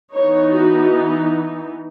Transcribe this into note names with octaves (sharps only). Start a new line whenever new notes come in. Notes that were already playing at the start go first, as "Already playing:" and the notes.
E3 B3 D#4 C#5
F#4